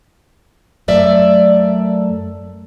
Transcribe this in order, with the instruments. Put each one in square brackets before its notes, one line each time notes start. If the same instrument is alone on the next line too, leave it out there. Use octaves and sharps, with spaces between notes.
[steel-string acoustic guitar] F#2 A3 D5 E5